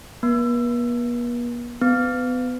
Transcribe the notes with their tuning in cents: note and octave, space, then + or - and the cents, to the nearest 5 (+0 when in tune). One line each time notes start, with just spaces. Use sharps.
B3 -45
B3 +30